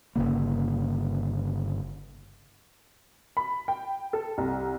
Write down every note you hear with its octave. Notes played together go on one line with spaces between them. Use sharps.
G1 F#2 C#3 A#3
B5
G5
A4
C2